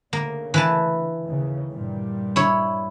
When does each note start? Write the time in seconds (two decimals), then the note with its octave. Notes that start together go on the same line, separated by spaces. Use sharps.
0.13 D2 C#3 A#3
0.54 E3 B4 A5
1.26 D#2 C#3
1.70 G2 A#2 G3
2.36 E4 C#5